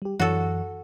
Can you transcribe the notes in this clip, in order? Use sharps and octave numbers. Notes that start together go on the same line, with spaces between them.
G3 G4
F#2 E3 F#4 A4 C#5